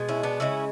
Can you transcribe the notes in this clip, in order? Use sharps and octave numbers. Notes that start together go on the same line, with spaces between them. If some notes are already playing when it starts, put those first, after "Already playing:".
Already playing: B2 G#3
C#4 E4
B3 D4
C#3 G#3 C#4 E4